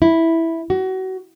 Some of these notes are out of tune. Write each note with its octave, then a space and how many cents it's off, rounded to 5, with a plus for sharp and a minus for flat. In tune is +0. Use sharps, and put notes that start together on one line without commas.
E4 -5
F#4 +30